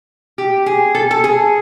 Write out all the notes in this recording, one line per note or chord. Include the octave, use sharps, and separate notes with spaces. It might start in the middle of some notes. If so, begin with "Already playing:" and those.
G4
G#4
A4
A4
G#4